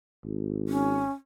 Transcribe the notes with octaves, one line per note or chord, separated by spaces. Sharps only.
G#1
C#4